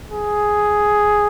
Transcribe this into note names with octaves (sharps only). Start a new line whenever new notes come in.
G#4